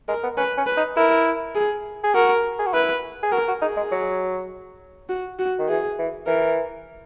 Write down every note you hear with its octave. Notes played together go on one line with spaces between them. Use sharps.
G#3 A#4
B3
C#4 B4
C#4
B4
D#4
E4 A#4
G#4
G#4
F#4 A#4
G#4
F#4
E4 B4
G#4
F#4 A#4
F#4
D#4 G#4
G#3
F#3
F#4
F#4
D#3
E3 G#4
E3
E3 A#4